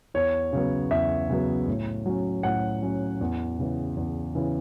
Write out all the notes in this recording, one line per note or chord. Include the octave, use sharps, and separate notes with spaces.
E2 C#5
C#3 F#3 B3
E2 E5
C#3 F#3 B3
A2
F#3 C#4
A2 F#5
F#3 C#4
E2
C#3 E3
E2
C#3 E3